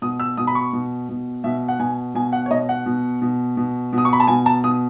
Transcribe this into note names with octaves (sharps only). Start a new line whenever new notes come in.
B2 D#6
E6
B2 D#6
B5
C#6
B2
B2
B2 E5
F#5
B2 G#5
B2 G#5
F#5
C#5
B2 D#5
F#5
B2
B2
B2
B2
D#6
C#6
B5
A5
B2 G#5
A5
B2 D#6